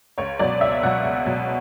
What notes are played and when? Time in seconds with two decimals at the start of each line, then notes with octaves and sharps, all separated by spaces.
0.18 C#2 C#5
0.39 B2 F#3 D5
0.61 C#2 E5
0.83 B2 F#3 F#5
1.04 C#2
1.26 B2 F#3